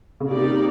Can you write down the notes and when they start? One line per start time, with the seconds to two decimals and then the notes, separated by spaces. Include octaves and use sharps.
0.20 C#3
0.30 C3 A#3 D#4 G4 A#4 D5